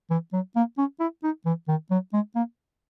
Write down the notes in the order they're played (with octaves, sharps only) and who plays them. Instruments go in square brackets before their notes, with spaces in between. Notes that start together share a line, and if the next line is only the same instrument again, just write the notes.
[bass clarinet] E3
F#3
A#3
C#4
E4
D#4
E3
D#3
F#3
G#3
A#3